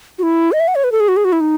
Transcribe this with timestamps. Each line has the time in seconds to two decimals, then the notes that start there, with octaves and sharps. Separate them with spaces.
0.19 F#4
0.23 E4
0.52 D#5
0.60 E5
0.68 F#5
0.75 C#5
0.84 B4
0.92 A4
1.00 G#4
1.08 F#4
1.17 G#4
1.25 F#4
1.32 E4
1.40 D#4